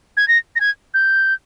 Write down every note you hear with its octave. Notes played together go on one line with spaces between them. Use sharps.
G#6
A#6
A#6
G#6
G6